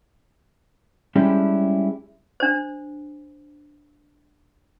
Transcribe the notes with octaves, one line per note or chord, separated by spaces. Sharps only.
G3 G#3 C#4 D4 E4 G4
D4 C5